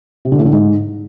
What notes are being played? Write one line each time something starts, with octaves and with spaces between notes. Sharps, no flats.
C3
D3
A2
D3
G#2